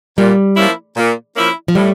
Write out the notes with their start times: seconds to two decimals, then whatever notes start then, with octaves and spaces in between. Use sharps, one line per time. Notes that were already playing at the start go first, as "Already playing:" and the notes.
0.18 A#2 G3
0.56 F3 A#3 C#4 E4
0.96 A#2
1.36 F3 A#3 C#4 E4
1.68 F3
1.75 A2 G3